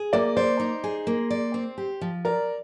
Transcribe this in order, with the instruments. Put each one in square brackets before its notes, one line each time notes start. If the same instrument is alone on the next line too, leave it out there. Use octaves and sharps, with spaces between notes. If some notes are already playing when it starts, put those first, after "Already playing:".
Already playing: [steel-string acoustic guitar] G#4
[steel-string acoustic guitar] A#3 [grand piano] D5
[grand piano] C5 [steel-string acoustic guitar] D5
[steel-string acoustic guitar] D#4
G#4
A#3
D5
C4
G4
F3
[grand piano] A#4 [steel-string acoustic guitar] D5